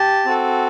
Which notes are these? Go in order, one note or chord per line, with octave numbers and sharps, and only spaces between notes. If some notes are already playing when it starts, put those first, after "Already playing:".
Already playing: G4 A5
C4 F#4 A4